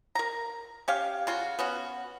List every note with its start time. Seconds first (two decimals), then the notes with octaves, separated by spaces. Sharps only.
0.15 A#4 A#5
0.88 C#4 G4 F5
1.27 C#3 F4 F#4
1.59 B3 C#4 F#4